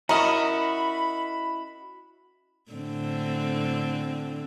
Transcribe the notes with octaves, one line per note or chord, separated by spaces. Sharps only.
C#4 E4 F#4 A#4 D#5 B5
A2 D3 C4